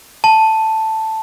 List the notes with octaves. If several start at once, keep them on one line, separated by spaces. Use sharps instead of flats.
A5